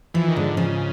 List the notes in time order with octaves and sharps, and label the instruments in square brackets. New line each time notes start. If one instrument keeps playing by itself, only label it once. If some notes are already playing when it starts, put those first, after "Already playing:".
[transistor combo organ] E3 [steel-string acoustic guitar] F3
[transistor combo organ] D#3
[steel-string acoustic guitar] G#2 [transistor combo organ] D3
[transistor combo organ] C#3 [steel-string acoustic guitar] F3